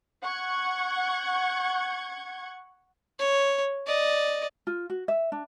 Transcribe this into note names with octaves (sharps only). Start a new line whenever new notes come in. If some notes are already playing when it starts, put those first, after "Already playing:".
F#5 C#6 G#6
C#5
D5 D#5
F4
F#4
E5
D4